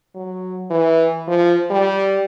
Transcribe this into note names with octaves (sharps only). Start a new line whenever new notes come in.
F#3
E3
F3
G3